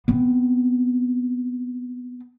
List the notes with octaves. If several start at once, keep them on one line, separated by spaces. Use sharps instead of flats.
B3 C4